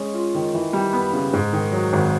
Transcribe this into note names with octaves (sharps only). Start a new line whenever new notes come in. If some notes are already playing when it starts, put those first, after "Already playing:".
Already playing: G#3 C#4
F4
D#3
E3
G3
B3
C#3
G#2
D#3
F#3
G#1